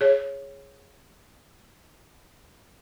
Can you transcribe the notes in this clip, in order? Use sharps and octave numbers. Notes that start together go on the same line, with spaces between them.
G#4 C#5